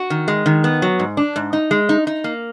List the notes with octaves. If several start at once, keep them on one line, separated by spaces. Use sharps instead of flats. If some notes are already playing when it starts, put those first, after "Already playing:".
Already playing: F#4
D#3
G#3
D#3
B3
F#3
G#2
D4
G#2
D#4
G#3
D#4
D#4
A#3